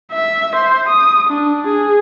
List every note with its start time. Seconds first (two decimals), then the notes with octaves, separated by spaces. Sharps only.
0.12 E5
0.56 C5
0.89 D#6
1.30 D4
1.67 G#4